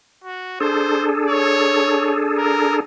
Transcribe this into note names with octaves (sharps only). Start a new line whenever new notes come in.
F#4
D4 G#4 A4 C5
C#5
A#4